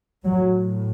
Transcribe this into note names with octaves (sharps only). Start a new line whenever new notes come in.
A2 F#3